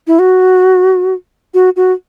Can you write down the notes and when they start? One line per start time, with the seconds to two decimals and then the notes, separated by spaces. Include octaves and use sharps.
0.07 E4
0.19 F#4
1.54 F#4
1.76 F#4